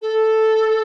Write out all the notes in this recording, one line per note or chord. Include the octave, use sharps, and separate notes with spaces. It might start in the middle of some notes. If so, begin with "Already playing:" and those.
A4